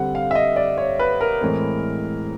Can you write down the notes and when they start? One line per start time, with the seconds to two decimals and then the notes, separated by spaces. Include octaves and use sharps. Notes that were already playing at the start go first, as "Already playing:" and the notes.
Already playing: D3 G3 C4 F#5
0.15 F5
0.31 E5
0.35 D#5
0.56 D5
0.78 C#5
0.99 B4
1.21 A#4
1.41 A2 E3 G#3 C4